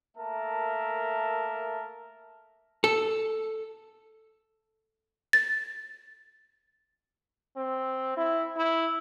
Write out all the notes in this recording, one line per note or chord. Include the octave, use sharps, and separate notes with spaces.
A3 A#3 A#4 E5 A5
A4
A6
C4
E4
E4